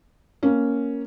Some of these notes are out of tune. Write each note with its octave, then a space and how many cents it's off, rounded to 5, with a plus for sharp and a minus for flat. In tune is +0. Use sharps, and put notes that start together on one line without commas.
A#3 +0 C#4 +0